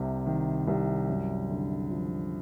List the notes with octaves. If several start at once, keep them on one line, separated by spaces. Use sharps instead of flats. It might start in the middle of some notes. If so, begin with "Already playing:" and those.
Already playing: C2 C3
D#3
C2
F#2
D3
F3